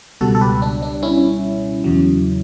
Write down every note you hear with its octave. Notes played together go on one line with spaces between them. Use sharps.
C#2 B2 G3 F#4 A4
A4
G4 B4
D4
D4
C#4 E4
E2 C#3 F#3